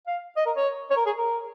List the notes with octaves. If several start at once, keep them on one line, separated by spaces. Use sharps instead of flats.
F5
D#5
A#4
C#5
C#5
A#4
G#4
A#4